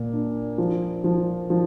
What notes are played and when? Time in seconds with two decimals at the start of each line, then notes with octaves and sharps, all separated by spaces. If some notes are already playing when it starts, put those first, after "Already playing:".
Already playing: A#2 A#3
0.13 D4
0.58 F3
1.04 F3
1.50 F3